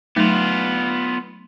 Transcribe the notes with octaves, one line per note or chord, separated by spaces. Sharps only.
F#3 A3 B3 D#4 F4